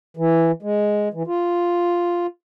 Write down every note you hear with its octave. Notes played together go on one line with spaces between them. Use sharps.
E3
G#3
E3
F4